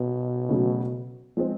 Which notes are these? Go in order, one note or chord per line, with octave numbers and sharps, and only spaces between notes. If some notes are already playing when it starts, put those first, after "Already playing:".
Already playing: B2
C#3 F#3 A3 C#4 F#4
F3 G#3 C4